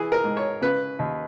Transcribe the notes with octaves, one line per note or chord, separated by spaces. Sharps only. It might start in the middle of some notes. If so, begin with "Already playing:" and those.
Already playing: E3 G#4
A#4
G#2
C#5
C#3 B4
D#2